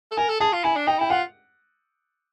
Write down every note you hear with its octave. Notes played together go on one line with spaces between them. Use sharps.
A4
A#4 G#5
A4
G#4 A5
F4
E4 G#5
D4
D#4 G5
E4 G5
F4 F#5